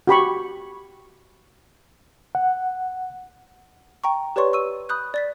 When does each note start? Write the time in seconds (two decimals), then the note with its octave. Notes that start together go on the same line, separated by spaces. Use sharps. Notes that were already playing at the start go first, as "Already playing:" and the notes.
0.07 F#4 G4 B5 C#6
2.35 F#5
4.04 G5 A#5 C#6
4.36 G4 B4 C#5 D5 C6 C#6
4.53 C#6 E6 D#7
4.89 B5 D#6 F#6 G6
5.14 D5 A6 B6